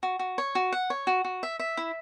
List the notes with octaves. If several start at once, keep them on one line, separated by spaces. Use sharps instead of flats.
F#4
F#4
C#5
F#4
F#5
C#5
F#4
F#4
E5
E5
E4